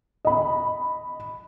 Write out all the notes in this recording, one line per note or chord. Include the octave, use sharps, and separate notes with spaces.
D#5 B5